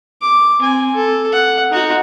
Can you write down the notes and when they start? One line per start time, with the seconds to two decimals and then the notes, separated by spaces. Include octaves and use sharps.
0.22 D6
0.60 C4 G#5
0.95 A4
1.32 F#5
1.71 D#4 F#4